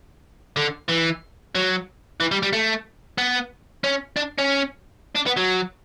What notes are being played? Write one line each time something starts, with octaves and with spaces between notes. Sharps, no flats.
D3
E3
F#3
E3
G3
G3
A3
B3
C#4
D4
C#4
D4
B3
F#3